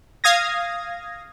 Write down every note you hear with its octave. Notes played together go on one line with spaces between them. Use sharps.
F5 D#6 G#6 A#6